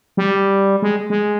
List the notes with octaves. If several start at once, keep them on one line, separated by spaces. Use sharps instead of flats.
G3
G#3
G#3